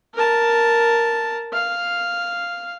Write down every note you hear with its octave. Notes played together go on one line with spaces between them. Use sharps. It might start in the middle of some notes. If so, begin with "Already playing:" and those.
A#4 A5
F5